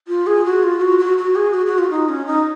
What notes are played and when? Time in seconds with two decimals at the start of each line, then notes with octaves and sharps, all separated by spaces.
0.08 F4
0.27 G#4
0.45 F#4
0.63 F4
0.81 F#4
0.99 F#4
1.18 F#4
1.36 G#4
1.54 F#4
1.66 F#4
1.79 F4
1.90 D#4
2.09 C#4
2.27 D#4